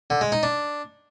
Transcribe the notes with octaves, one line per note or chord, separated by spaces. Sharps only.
D3
G#3
D#4
D4